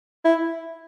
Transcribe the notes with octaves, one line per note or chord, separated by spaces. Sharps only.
E4